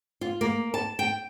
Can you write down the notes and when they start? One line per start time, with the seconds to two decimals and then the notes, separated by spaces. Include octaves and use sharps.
0.21 F4
0.41 A#3
0.74 A5
0.99 G5